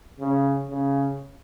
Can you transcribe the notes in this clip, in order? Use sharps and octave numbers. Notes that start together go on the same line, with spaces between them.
C#3
C#3